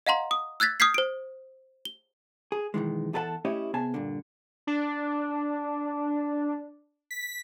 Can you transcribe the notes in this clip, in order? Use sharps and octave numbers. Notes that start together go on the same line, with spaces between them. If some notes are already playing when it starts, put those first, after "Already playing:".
D#5 F5 F#5 A#5 C6
D#6
E6 F#6 G#6 A6 B6
D#6 F6 G6 G#6 B6 C7
C5 D7
G7
G#4
B1 D#3 E3 G#3
E2 G#4 A4 B4 F#5 A5
A3 C#4 E4 G4 C#5 D#5
C3 B3 G#4 G#5 A5
G2 A#2 D3
D4
B6